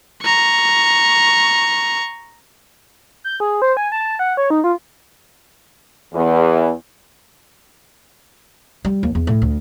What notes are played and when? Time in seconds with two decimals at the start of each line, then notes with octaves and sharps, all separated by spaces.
0.23 A#5 C#6
3.24 G6
3.40 G#4
3.62 C5
3.77 G#5
3.92 A5
4.19 F#5
4.37 C#5
4.50 D#4
4.64 F4
6.14 E2
8.85 G3
9.03 D#2
9.15 E2
9.27 A2
9.42 D2